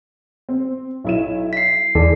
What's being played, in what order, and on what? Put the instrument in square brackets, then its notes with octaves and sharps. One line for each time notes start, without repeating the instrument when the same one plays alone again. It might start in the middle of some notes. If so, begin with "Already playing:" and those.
[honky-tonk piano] C4
B1 E4 E7
[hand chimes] B6 C7
[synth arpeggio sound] E2 [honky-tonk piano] G#4 [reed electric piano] A4 D5